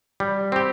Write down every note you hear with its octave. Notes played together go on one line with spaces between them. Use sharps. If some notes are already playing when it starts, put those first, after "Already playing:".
G3
C4 G4